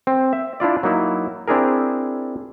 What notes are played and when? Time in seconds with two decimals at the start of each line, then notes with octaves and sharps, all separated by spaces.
0.07 C4
0.33 E5
0.60 D4 E4 F4 D5
0.83 F#3 A#3 D#4 E4
1.48 C4 D4 E4 G#4 A#4